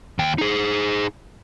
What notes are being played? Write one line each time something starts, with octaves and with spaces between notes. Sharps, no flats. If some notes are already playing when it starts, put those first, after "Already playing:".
D#2 G5
D#4 G#4